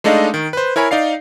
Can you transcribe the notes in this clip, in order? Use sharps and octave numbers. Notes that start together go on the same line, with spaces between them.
G#3 A3 D4 D#4 D#5 F5
D#3
B4 C5
E4 A#4 C#5 G#5 B5
D#4 D5 F5 C7